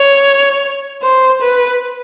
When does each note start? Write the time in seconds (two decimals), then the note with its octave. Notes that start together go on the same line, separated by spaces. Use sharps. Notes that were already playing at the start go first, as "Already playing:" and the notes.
Already playing: C#5
1.03 C5
1.42 B4